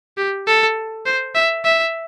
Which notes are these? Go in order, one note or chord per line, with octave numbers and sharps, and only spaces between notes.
G4
A4
C5
E5
E5